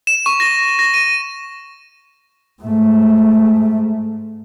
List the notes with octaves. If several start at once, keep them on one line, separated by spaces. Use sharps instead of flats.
E7
C#6
A#6
A#6
D#7
G#2 A3